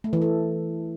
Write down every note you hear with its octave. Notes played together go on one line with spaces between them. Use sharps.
A3
E3
A4